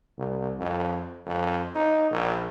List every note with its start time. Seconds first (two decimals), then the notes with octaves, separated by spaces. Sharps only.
0.18 C2
0.58 F2
1.27 F2
1.75 D#4
2.11 A#1